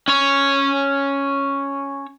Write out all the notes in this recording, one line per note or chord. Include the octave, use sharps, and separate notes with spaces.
C#4 C#5